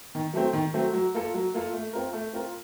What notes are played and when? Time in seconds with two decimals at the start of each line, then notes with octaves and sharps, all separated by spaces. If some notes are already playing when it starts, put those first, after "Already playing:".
0.15 D#3
0.34 F#3 A3 C4
0.53 D#3
0.74 F#3 A3 C4
0.93 F#3
1.14 A#3 F4 A4
1.34 F#3
1.54 A#3 F4 A4
1.73 A3
1.93 C4 F4 A#4
2.13 A3
2.33 C4 F4 A#4